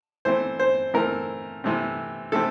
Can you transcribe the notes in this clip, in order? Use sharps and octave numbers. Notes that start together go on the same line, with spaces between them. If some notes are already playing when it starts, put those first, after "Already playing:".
E3 A3 C4 C5
C5
E3 A3 C4 A#4
C3 E3 A3 C4
C3 E3 A3 C4 A4